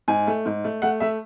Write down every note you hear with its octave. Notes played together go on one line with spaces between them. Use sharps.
G#2 G#5
A3
G#2
A3
A3 F#5
A3 E5